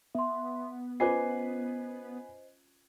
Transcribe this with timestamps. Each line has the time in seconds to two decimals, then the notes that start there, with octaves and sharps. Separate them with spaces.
0.15 B3 E5 C6
1.00 C#4 F4 B4 C5 D#5 G#5 D6 C7